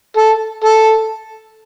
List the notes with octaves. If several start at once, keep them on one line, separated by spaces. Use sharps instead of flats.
A4
A4